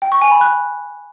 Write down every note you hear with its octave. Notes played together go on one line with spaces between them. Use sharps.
G5
C#6
G#5
B5
F#6